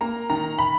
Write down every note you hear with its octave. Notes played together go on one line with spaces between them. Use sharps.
A#3 A#5
D#3 A#5
B5